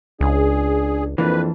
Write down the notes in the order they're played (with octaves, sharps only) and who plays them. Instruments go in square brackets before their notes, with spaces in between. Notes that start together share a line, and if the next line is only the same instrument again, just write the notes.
[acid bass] C#2 [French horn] D4 [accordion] G#4
[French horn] F2 [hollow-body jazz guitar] E3 A#3 D4 [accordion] B4